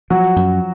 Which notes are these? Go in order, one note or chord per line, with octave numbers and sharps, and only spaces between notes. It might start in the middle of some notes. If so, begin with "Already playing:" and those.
F3 F#3 F#4
F#2